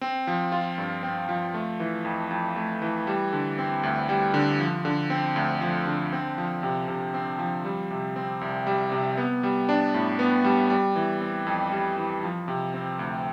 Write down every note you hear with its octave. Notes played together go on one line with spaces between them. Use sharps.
C4
F3
F4
G2
C4
F3
A3
E3
F2
F2
A3
E3
G3
D3
C4
D2
G3
D3
F3
D3
C4
D2
F3
D3
C4
F3
C3
C3
C4
F3
G3
C3
C4
C2
G3
C3
B3
G3
D4
A2
B3
G3
G3
E3
C4
F2
G3
E3
F3
C3
C4
D2